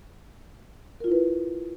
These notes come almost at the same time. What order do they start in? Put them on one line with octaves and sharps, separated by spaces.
A#4 F4 E4 B4